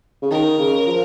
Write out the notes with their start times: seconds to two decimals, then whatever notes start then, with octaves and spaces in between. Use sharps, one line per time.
0.22 C#3
0.31 D#3 A#4
0.59 C#3
0.87 F3